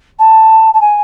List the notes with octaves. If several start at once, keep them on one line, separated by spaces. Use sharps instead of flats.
A5
A5
G#5